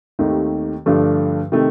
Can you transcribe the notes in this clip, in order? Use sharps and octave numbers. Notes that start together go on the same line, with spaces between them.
D#2 D#3 A3 C4 G4
G2 D3 F3 A3 D4
C3 D#3 A3